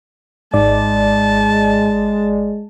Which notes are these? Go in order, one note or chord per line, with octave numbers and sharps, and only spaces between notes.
G#1 G#2 G#3 D5 A5